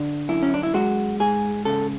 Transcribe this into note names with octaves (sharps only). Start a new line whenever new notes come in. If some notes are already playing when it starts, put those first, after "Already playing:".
Already playing: D3
F#2 E4
C#4
D4
E4
G#3 F#4
G#2 G#4
C#3 A4